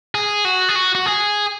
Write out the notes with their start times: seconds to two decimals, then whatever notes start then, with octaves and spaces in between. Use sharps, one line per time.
0.15 G#4
0.45 F#4
0.69 G#4
0.76 F#4
0.95 F#4
1.06 G#4